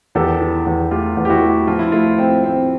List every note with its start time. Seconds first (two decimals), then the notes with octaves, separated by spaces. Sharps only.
0.15 E2 G4 A4
0.41 E3
0.66 E2
0.91 A3 F4 G4
1.17 E2
1.25 G4
1.29 E4 F#4
1.42 A3
1.67 F3 F4
1.79 E4
1.92 A3 F4
2.18 C4
2.44 C4